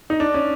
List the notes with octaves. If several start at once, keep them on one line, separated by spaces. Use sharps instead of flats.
D#4
D4
C#4